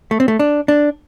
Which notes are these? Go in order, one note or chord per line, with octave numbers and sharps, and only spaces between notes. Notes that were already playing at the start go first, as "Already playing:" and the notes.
A3
C4
A3
D4
D4